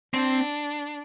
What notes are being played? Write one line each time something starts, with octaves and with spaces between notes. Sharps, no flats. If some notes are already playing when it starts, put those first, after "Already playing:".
C4 D4